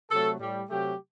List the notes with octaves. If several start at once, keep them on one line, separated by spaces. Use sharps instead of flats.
C3 F#3 A3 A4
A2 G3
C3 F#3 A3 G4